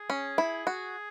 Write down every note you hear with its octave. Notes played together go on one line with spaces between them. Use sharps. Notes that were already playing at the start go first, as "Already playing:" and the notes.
Already playing: G#4
C#4
E4
F#4